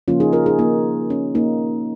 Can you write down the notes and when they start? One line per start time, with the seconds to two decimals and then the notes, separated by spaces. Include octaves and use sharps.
0.08 C#3 F3 A#3 C#4 F4
0.20 D#4 G#4
0.32 F4 A#4
0.46 D#4 G#4
0.59 A#3 D#4
1.10 C#4
1.35 A#3 D#4